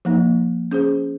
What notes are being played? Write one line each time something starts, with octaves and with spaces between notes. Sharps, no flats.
F3 A#3 D#4
C#4 G#4 C5